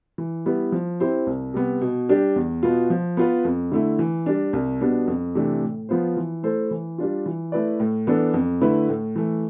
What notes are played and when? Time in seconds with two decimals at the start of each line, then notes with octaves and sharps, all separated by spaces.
0.18 E3
0.46 G3 B3 E4 B4
0.72 F3
1.00 C4 E4 G4 C5
1.27 C2
1.54 C3 G3 B3
1.81 B2
2.09 G3 D4 G4
2.36 E2
2.63 B2 B3 F4
2.90 F3
3.17 B3 F4 B4
3.45 F2
3.72 D3 A3 E4
3.99 E3
4.26 G3 D4
4.53 C2
4.81 B2 G3 B3 D4
5.07 F2
5.35 C3 E3 A3 D4
5.62 A2
5.89 F3 B3 F4 C5
6.17 E3
6.43 A3 E4 A4 C5
6.71 E3
6.98 G3 D4 F4
7.26 E3
7.52 A3 E4 B4 D5
7.80 A2
8.07 E3 B3 D4 A4
8.34 F2
8.61 D3 A3 E4 B4
8.89 A2
9.16 E3 A3